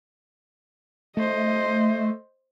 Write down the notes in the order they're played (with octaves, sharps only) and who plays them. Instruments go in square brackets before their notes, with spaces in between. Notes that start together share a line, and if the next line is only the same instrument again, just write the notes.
[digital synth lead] A3 [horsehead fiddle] C5 D#5